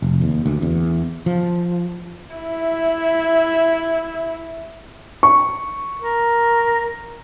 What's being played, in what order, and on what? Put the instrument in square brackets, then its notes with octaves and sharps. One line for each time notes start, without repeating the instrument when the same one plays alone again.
[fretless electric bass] F1
D#2
D2
E2
F3
[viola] E4 E5
[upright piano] C#6
[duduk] A#4